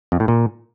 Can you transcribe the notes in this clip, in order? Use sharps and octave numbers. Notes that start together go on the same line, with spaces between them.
F2
A2
A#2